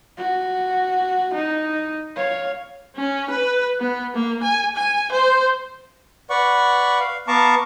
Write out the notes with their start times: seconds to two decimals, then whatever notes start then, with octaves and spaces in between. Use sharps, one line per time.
0.18 F#4
1.34 D#4
2.16 C#5 F5
2.96 C#4
3.30 B4
3.80 B3
4.14 A#3
4.43 G#5
4.76 G#5
5.12 C5
6.30 B4 D5 F#5 C#6
7.00 F5
7.28 B3 F5 A5 A#5 C#6 D6